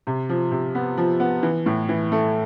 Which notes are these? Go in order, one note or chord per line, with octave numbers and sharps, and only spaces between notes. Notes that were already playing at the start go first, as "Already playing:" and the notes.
C3
F3
C3
B3
F3
B3
E3
A2
E3
A3